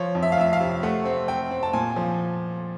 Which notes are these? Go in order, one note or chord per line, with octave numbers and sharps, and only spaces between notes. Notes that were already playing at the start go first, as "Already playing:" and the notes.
Already playing: F3 C#5
F2
E5
F5
F2 E5
F5
C3
A3 F#5
C4
C4 G5
C4
A5
A#2 G#5
F3